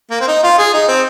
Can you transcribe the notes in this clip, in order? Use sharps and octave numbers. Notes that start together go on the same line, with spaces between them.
A#3
C4
D#4
F4
G#4
D#4
C4